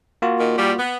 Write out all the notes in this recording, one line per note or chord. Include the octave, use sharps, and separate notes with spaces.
A#3 F4 F#4
A#2 D#3
A#2 G3
B3